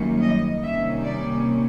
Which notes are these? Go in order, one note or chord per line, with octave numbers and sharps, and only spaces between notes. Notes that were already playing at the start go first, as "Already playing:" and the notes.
Already playing: F#2 D#3 G3 A#3 C#4
D#5
C3 D#3 G3 A#3 C#4 E5
D5